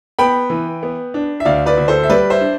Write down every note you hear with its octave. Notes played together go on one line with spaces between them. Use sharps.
B3 G5 B5
E3
B3
D4
E5
D2 D5 F5
B4 D5
D2
A4 C5
E5
G3 B4 D5
C5 E5
D4